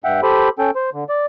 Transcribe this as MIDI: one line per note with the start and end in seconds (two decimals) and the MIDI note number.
0.04 0.21 43
0.04 0.21 76
0.04 0.21 78
0.04 0.21 79
0.23 0.49 67
0.23 0.49 69
0.23 0.49 72
0.23 0.49 83
0.59 0.70 61
0.59 0.70 69
0.59 0.70 79
0.75 0.90 72
0.93 1.04 50
1.09 1.26 74